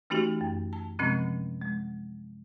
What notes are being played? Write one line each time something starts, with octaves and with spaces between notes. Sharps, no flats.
E3 A3 C#4 D#4 F#4 G4
F#2
A5
C3 F3 G#3 C4 C#4
G#3